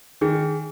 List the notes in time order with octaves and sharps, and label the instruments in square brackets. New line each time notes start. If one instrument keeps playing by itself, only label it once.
[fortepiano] D#3 [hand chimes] G#4